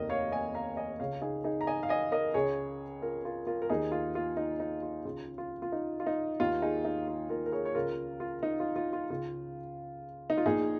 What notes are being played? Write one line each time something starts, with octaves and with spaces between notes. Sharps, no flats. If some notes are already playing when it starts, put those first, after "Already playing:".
Already playing: F1 D#2 D#3 A#4 D#5
C#5 F5
D#5 G#5
F5 A#5
D#5 G#5
C#2 C#3 C#5 F5
D#4 G#4
D#4 G#4
A#5
D#5 G#5
F5
D#5 G#5
A#4 D#5
C#2 C#3 G#4 C#5
F4 A#4
F4 A#4
F4 A#4
A#4
D#2 D#3 D#4 G#4
F4
F4
D#4
D#4
F4
C#2 C#3 F4
F4
F4
D#4
F4
D#4
D#2 D#3 F4
D#4 G#4
D#4
F4
F4 A#4
A#4
G#4 C#5
C#5
C#2 C#3 F4 A#4
F4
D#4
F4
F4
F4
C#2 C#3 F4
D#4
F4
A#1 A#2 D#4 G#4